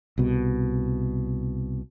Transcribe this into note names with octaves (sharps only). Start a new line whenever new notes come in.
C2 B2